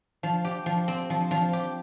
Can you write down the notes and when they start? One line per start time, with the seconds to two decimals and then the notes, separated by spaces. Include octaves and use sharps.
0.23 F3
0.45 G4
0.66 F3
0.88 C4
1.10 F3
1.31 F3
1.53 G4